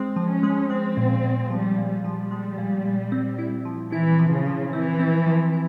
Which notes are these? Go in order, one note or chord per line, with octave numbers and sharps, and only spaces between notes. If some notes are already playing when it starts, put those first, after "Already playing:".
Already playing: G#3 C4
F3
C#4
G#3
G#3 C4
A#2
A#2
F3 G3
A#2
G3
F3
G#3
A#2
A#2
C4
E4
F3
E3 E4
F3
C#3
F3
E3 C4
C4
F3
E4